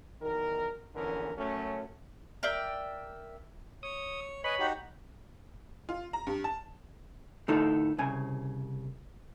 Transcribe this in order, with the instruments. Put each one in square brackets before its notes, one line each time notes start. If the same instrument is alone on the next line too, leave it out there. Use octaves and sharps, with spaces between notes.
[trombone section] B1 E2 D#3 A#4
A#1 E2 D3 E3 C#4 A#4
F#2 F#3 A3 C#4
[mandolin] A#4 D5 E5 G5
[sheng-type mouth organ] C#5 [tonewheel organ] D#6
[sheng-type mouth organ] B4 D#5 G#5 [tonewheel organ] C#5 B5
[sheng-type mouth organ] D#4 F#4 G4
[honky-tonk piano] F4
A#5
G2
A5
[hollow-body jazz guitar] A2 D3 D#4 F4 A4
C2 C#3 G#5